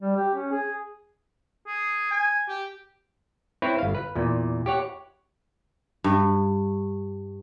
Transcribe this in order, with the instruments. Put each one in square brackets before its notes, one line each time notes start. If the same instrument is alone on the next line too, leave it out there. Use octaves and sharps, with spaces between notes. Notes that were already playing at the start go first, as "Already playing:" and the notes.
[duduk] G3
G4
C#4
G#4
[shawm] G#4
G#5
G4
[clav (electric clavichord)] C4 E4 B4 C#5
G1 F5
B4
E2 A#2
G4 C#5 F#5
[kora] G2